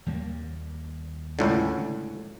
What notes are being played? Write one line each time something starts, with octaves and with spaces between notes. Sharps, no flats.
D#2 G3 A#3
C#2 A2 D3